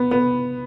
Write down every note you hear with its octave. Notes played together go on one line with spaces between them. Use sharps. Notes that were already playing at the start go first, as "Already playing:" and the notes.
Already playing: B3
B3